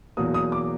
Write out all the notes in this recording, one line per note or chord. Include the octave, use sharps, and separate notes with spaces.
E2 B2 F#3 A#3 D#6
D#6
D6